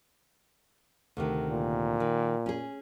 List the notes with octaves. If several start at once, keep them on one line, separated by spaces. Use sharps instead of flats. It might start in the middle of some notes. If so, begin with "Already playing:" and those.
D2 C3 D#3
A#2
D#3
C#4 G#4